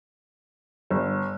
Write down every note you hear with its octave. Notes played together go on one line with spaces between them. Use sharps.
G1